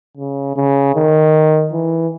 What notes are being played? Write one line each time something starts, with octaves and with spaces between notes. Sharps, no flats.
C#3
C#3
D#3
E3